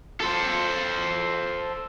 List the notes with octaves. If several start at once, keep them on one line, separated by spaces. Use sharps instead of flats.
A4 C5